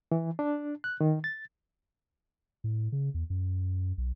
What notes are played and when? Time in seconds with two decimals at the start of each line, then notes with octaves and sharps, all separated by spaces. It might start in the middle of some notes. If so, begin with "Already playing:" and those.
0.12 E3
0.39 D4
0.84 F#6
1.01 D#3
1.24 A6
2.64 A2
2.92 C#3
3.14 E2
3.30 F#2
3.98 B1